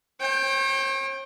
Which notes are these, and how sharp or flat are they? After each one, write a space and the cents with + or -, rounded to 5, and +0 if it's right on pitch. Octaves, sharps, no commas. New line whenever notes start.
C#5 -45 G5 +5